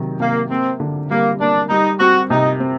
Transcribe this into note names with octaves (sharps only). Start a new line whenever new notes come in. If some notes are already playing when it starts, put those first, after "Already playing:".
Already playing: C3 D#3 F#3
C3 A#3
A#3 C4
D3
G3 A#3
A#3 D4
G3 D#4
C4 F#4
C3 D#4
C4